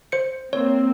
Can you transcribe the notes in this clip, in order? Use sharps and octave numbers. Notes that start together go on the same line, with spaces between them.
C5 C#7
A#3 C4 C#5